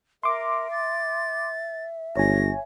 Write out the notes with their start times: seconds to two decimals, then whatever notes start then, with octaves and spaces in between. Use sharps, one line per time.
0.23 A#4 E5 C6 D6
0.71 A6
2.17 G1 C#5 G#5 A#6